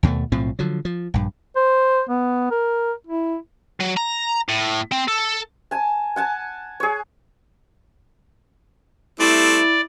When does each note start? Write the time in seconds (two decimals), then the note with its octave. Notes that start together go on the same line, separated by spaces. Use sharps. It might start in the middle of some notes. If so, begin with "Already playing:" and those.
0.03 D#2 B2 G3 A3
0.32 B1 A2 F3 C4
0.59 D3 F3 F#3
0.85 F3
1.14 A#1 G2
1.56 C5
2.09 B3
2.51 A#4
3.07 E4
3.80 F#3
3.97 A#5
4.49 A2
4.92 C4
5.08 A4
5.71 G#5 A5
6.16 F#5 G#5 A5
6.80 G#4 C#5
9.20 G3 A3 C4 E4 D5